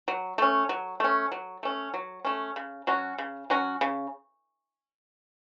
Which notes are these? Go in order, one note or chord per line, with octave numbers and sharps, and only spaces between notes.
F#3
A3 C#4
F#3
A3 C#4
F#3
A3 C#4
F#3
A3 C#4
C#3
F#3 C#4 F#4
C#3
F#3 C#4 F#4
C#3